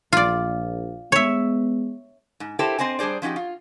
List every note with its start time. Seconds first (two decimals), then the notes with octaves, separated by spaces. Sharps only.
0.13 A#1 F4 D5
1.12 G#3 B3 C#5 E5
2.40 G#2
2.59 E4 G4 A4 A#4 C5
2.79 C4 C5 D#5 G#5
2.99 G3 D4 G#4 C5 D5
3.22 F3 C#4 D#4 F#4 G4
3.36 F4